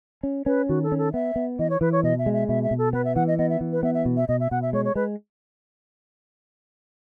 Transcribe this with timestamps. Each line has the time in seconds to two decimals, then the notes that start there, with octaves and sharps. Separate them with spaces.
0.23 C#4
0.46 C#4 B4
0.69 D#3 F#4
0.83 A4
0.92 C#4
0.98 A4
1.13 B3 E5
1.36 B3
1.59 E3 D#5
1.70 C#5
1.81 E3 B4
1.92 C#5
2.03 B2 D#5
2.19 E5
2.26 G#3
2.33 E5
2.48 B2 E5
2.63 E5
2.71 B2
2.78 A4
2.93 B3 B4
3.05 E5
3.16 E3 F#5
3.28 D#5
3.38 B3 D#5
3.50 E5
3.61 E3
3.73 B4
3.83 B3 E5
3.94 E5
4.05 B2
4.17 E5
4.28 B2 D#5
4.40 E5
4.51 B2 F#5
4.62 E5
4.73 G#3 C#5
4.85 C#5
4.95 G#3 B4